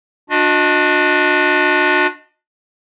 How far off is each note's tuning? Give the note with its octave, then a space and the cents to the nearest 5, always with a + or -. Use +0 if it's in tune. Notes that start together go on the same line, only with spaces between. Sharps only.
D4 +5 F#4 -45 D#5 +0